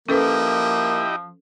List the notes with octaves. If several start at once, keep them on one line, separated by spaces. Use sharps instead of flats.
F3 A#3 C#4 E4 G4 A4 B4 D#5